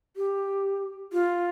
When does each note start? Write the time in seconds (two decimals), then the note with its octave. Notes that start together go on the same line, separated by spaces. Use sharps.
0.16 G4
1.13 F4